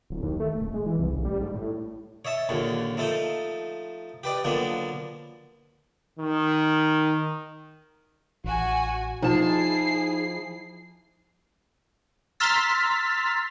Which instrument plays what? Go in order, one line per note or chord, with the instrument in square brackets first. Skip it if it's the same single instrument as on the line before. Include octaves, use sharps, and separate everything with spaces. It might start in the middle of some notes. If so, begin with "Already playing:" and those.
[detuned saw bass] D1
D#2
A3
D1
G#3
E3
C2
A1
G3
G#2
A2
[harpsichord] C#5 D#5 E5 A5
A#1 D#2 A#2 D3 C#5
F3 A3 D#4 A4 C5
G4 B4 D5 D#5
D3 F3 F#3 A#3 B3 D4
[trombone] D#3
[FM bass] A1 [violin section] F#4 G#5
[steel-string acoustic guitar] F3 A5 [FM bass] D#4 [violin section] E4 G#4 C7
[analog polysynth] A#5 C6 E6 F6 A6 B6